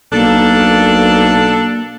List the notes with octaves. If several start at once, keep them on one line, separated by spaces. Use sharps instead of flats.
B1 A#3 D4 A4